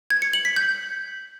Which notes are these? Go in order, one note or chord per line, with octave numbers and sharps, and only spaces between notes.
G#6
C#7
F#7
B6
G6